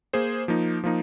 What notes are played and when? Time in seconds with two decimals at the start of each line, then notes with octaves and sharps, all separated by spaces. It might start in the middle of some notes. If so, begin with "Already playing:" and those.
0.13 A#3 G#4 C5
0.48 F3 A#3 D#4
0.84 F3 A#3 D#4